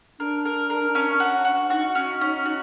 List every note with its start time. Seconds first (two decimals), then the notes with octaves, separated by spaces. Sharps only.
0.20 D4 A#4
0.45 A#4
0.70 A#4
0.95 C#4
1.20 F#4
1.45 F#4
1.70 D#4 F#4
1.95 C#4
2.21 C#4
2.46 F#4